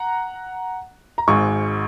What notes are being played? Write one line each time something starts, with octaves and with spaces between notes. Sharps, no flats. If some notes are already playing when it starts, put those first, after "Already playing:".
Already playing: F#5 A#5
A#5
G#1 G#2 G#3 G#5 C#6